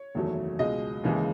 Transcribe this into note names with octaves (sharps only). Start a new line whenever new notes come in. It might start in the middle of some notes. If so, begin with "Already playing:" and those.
Already playing: C#5
F#1 E2 D#3 F#3 A3
C#2 B2 G#3 D#5
D#2 C#3 E3 G#3